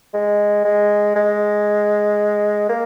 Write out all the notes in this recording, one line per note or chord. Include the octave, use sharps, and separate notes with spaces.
G#3
G#3
G#3
A#3